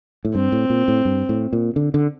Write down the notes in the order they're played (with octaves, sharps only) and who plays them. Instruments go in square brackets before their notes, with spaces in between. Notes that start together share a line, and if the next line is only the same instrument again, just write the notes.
[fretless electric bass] A2
[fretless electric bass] G2 [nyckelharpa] C4
[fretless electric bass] A2
A#2
A2
G2
A2
A#2
D3
D3